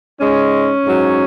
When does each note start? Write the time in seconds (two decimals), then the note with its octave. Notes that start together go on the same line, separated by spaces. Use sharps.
0.20 G#2 G#3 C#4
0.84 G#2 F#3